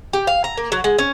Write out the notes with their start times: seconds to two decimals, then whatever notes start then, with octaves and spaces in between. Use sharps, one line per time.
0.13 G4
0.27 F5
0.44 A#5
0.57 A#3
0.72 F#3
0.84 G#3
0.99 C#4